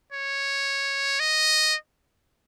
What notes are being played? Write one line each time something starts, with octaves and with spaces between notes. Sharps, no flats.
C#5
D#5